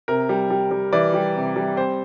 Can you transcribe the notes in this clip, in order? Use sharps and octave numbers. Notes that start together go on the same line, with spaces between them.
C3 A#4
G3
G3
G3
E3 D5
G3
C3
G3
C4 C5